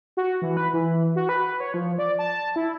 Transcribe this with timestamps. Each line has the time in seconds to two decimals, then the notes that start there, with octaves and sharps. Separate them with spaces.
0.17 F#4
0.42 E3
0.57 B4
0.73 E3
1.16 F#4
1.29 B4
1.60 C#5
1.74 F3
1.98 D5
2.19 A5
2.56 E4